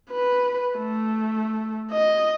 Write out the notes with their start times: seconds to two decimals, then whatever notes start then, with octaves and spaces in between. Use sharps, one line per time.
0.11 B4
0.78 A3
1.92 D#5